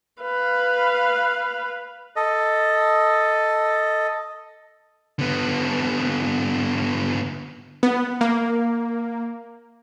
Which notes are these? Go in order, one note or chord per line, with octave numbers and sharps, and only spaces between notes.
B4 F5
A4 D#5
D3 B3
B3
A#3